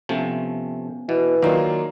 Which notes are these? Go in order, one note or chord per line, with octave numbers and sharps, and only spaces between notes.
C3 F3 A3 B3 C#4 G#5
B2 E3
D#3 F#3 A#3 F4 D5 A#5 E6